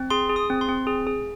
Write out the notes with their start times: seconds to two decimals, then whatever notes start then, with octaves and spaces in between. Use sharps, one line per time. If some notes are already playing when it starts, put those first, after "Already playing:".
Already playing: C4
0.10 G#4 C6
0.29 G#4
0.36 D#6
0.50 C4
0.61 C6
0.69 C4
0.87 G#4
1.07 G#4